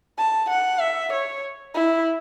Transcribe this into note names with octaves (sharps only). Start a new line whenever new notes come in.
A5
F#5
E5
C#5
E4